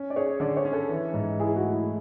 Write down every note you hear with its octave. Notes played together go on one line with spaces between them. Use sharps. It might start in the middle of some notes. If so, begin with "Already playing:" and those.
Already playing: C#4
D5
G#4 C#5
D3 D5
C#5
C#4
A4
E3
G#2
E4 G#4
F#4
A3
E4